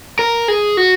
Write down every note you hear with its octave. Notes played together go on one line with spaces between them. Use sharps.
A#4
G#4
F#4